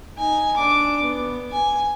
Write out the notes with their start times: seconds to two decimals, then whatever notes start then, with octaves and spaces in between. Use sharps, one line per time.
0.17 D#4 G#5
0.57 D4 D6
1.01 B3
1.52 G#5